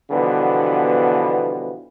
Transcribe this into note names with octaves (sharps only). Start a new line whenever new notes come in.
B2 D3 E3 F3 G3 B3